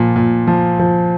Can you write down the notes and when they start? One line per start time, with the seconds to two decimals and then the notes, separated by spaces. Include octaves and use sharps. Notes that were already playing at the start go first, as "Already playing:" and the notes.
Already playing: A#2 F3
0.16 A#2
0.47 F3
0.79 F3